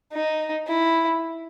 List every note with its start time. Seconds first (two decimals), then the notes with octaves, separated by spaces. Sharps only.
0.12 D#4
0.67 E4